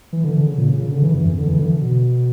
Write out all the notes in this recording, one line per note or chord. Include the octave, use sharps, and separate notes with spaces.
E3
D3
D3
C#3
A#2
C#3
C#3
D3
E3
F#2
E2
D3
E3
D3
B2